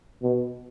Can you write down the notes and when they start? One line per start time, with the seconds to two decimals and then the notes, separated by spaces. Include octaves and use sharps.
0.23 B2